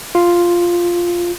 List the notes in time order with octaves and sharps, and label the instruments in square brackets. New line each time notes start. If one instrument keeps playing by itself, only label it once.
[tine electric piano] F4